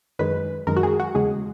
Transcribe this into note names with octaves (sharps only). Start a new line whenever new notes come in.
F#2 D#3 G#3 B4
F#2 D#3 G#3 A#4
F#4
G#4
F#4
E2 C#3 G#3 G#4